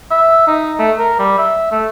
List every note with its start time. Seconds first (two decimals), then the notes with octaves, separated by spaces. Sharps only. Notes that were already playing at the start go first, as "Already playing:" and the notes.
0.11 E5
0.47 D#4
0.79 A3
0.98 A#4
1.19 G3
1.38 E5
1.72 A3